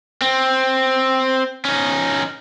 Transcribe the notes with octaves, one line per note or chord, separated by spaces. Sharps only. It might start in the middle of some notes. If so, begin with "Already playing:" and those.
C4
C#4 D#4